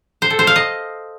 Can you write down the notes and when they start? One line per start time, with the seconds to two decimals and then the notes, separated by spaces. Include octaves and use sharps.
0.22 C5
0.30 A4
0.39 C5
0.47 F5
0.56 D#5